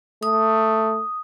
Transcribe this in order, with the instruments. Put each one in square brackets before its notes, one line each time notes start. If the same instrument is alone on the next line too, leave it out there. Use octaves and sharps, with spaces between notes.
[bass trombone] A3 [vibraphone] D#6